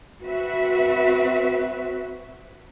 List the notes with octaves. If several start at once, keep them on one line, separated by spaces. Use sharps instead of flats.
C4 F#4 B4 E5